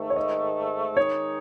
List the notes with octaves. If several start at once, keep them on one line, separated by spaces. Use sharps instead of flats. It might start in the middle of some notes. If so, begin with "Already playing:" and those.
Already playing: G#2 D#3 A3
C#5
D#5
D#3 G#3 D#4 C#5